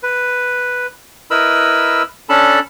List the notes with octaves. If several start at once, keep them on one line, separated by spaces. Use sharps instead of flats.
B4
E4 A#4 B4 D#5 B5 E6
C#4 D4 A4 A5 B5